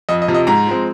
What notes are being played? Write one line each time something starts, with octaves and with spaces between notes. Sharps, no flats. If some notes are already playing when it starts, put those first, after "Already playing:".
F2 D#5
D#5
C3 F3
D#5
G#2 A#5
F3 G#3 C4